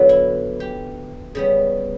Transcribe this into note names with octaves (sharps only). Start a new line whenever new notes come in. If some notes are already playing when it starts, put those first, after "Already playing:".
Already playing: D3 F#3 B3
E4
G4
C#3 G3 B3